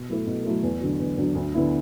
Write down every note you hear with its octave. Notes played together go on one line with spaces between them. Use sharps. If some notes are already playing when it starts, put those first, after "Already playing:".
Already playing: B2
F#3 A3 E4 A4
B2
F#3 A3 E4 A4
E2
D3 F#3
E2
D3 F#3
D2
D3 B3 E4